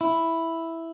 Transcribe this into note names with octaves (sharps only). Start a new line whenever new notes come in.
E4